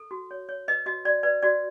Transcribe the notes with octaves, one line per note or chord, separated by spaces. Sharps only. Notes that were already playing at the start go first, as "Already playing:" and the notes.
Already playing: A4
F#4
C#5
C#5
B4 D#5
F#4 D#5
F#4 D5
B4 D5
F#4 D5